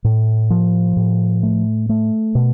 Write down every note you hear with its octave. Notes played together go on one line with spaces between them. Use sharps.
A2
F3
A2
A3
A3
B2